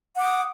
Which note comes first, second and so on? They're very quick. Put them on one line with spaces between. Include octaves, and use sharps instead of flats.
F#5 D6 D#6